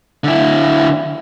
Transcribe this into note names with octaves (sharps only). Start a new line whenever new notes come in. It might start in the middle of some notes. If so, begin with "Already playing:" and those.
D3 E4